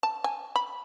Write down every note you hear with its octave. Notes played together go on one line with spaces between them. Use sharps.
A5
G#5
B5